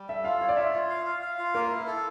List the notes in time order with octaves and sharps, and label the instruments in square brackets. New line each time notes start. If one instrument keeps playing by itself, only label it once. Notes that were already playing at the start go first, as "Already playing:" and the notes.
Already playing: [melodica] G3
[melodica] A4 [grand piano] E5
[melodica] F4 [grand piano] F5
[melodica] C#5 [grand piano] F5
[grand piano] D5
[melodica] F4 [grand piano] E5
[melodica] F4
F5
F5
F5
F4
[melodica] A#3 [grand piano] A#4
[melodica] E4
A4